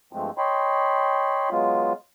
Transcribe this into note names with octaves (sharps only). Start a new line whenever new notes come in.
G2 F3 G#3 A3 C4
C#5 D#5 G5 B5 C6
F#3 G#3 B3 F4